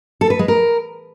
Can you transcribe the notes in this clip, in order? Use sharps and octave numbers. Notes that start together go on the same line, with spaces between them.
A4
B4
G#3
A#4